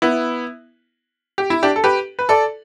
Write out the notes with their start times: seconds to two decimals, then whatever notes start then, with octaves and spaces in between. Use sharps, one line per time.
0.02 B3 E4
1.38 G4
1.50 E4
1.63 D4 G4
1.76 A4
1.84 G4 B4
2.19 B4
2.29 A4 D5